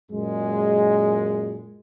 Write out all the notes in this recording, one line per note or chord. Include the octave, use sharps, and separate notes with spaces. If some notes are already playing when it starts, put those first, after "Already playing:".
F#2 A#2 G#3